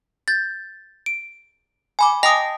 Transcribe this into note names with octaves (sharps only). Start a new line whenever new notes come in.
G6 A6
D7
G#5 B5 D6
D#5 G5 A5 D#6 A#6 F7